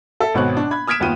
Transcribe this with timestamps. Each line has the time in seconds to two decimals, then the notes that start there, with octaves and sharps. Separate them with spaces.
0.20 A4 E5
0.34 G#1 B2 B3 C4 C#5 F#6
0.57 D4
0.71 B5 G#6
0.87 D#6 F6 G#6 B6 D7 E7
1.00 F#1 D#2 B3 F4 G5 D#7